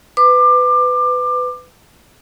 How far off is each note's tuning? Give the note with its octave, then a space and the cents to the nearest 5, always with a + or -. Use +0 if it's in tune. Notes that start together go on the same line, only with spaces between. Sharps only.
B4 +20 D6 +25